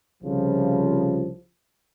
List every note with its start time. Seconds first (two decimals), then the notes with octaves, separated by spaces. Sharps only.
0.23 C2 C#3 F3